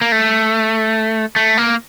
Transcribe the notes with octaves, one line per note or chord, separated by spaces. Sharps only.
A#3
A3
A3
A#3